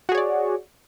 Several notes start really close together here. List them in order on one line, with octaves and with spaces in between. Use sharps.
F#4 G#4 C#5 D5